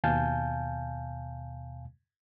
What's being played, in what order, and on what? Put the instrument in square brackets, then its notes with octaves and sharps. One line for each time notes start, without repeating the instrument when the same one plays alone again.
[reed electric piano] D#2 B2 F5 G#5 A5 G6